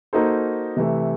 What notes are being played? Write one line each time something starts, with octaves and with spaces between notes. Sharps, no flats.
A#3 D#4 F#4 A4 C5
C3 E3 A3